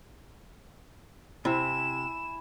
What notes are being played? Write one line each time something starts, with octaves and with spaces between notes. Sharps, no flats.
C3 E4 G#5 E7